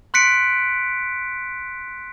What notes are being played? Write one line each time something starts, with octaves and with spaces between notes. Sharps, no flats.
C6 F#6 B6 C#7 D7